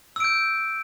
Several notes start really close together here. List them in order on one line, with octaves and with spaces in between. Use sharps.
E6 D7 G6